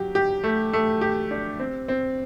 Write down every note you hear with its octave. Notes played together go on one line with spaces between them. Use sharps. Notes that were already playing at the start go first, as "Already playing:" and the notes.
Already playing: F#3 G4
G4
A3
A3
G4
D4
C4
C4